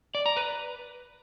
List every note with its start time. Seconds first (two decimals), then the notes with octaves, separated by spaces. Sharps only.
0.15 D5
0.26 A#5
0.37 B4